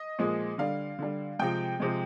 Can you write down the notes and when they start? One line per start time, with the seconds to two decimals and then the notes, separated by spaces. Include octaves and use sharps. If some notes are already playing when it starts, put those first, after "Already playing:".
Already playing: D#5
0.19 A#2 F3 G#3
0.58 D3 G3 F5
0.99 D3 G3
1.39 C3 F3 G#3 G5
1.80 C3 F3 G#3